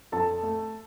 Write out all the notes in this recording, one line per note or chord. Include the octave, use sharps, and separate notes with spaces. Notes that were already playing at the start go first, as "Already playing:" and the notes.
F2 A4 A5
A3